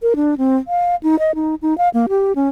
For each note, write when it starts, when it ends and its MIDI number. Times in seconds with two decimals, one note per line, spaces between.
0.02 0.14 70
0.16 0.35 62
0.38 0.57 60
0.68 0.96 77
1.03 1.19 63
1.19 1.35 75
1.35 1.55 63
1.62 1.77 63
1.78 1.89 77
1.94 2.06 58
2.09 2.32 67
2.36 2.49 61